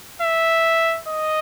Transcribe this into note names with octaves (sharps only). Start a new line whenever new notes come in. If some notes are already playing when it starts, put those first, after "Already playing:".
E5
D#5